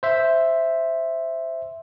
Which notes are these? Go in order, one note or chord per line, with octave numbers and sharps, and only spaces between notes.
C5 E5